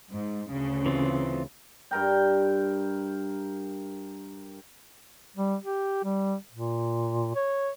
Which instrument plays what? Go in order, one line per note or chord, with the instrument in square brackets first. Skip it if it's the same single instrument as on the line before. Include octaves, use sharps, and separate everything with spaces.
[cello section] G#2
D2 C#3
[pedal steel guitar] E3 C4 F4
[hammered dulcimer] G2 A#4 G5
[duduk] G3
G4
G3
A#2
C#5